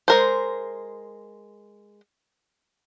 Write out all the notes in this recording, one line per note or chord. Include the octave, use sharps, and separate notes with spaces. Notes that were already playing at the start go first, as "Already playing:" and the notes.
G#3 A#4 C5